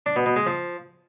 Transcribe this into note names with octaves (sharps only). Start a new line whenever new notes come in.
D4
B2
B2
G#3
F3